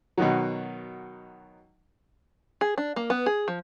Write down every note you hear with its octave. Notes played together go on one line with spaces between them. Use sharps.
B2 D#3 F#3
G#4
D4
A#3
B3
G#4
F3